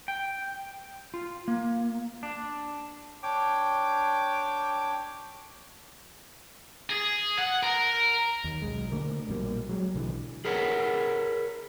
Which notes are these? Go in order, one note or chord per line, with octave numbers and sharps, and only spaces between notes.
G5
F4
A#3
D4
D4 C#5 G5 D6
G#4
F#5
A#4
D#2
B1 G#3
D3 A3 A#3
A#1 B2 G3 A#3
F#3 G#3
B1 D3 E3
G#4 A#4 B4 C#5 F#5